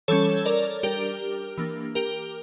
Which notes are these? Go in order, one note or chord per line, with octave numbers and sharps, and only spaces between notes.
E3 G3 C#4 A4 C#5
A#4 D5
G3 D4 G4 A#4
E3 A#3 D4
G4 A#4